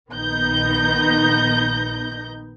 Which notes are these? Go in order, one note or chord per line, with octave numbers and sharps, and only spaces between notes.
A#1 D#3 B3 D#4 G6 A#6